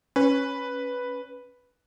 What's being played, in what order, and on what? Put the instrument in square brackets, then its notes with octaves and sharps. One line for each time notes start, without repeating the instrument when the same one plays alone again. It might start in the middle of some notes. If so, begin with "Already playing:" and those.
[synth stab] C#4 [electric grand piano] B4